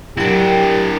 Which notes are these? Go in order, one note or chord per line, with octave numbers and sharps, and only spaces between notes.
F#3 D4 E4 G4 A#4 G5